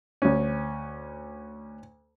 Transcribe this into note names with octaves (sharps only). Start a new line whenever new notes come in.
D2 C#4